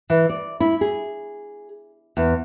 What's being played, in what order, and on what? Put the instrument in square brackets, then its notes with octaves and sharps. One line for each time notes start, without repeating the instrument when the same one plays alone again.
[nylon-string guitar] E3
D5
E4
G#4
E2